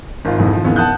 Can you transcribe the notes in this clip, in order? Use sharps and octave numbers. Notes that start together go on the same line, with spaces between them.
G#1 F4
F2 G#2 C3 E3
F3
D#2 C#3 E3 B3
F#5 A5 D#6 F#6 G6